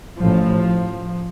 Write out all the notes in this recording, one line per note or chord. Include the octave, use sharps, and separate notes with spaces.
A1 A2 F3